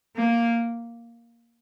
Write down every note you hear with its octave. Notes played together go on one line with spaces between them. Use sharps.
A#3